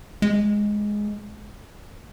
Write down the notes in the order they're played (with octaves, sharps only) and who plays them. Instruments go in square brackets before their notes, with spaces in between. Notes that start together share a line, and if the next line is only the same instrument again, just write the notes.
[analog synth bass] G#3